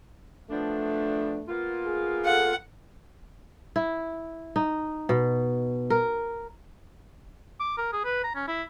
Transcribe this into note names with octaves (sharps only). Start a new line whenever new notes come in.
F3 A3 B3 D4
A#3 B3 F4
G#4
A4 F5 F#5
E4
D#4
B2
A#4
D6
A#4
G#4
B4
A#5
C#4
E4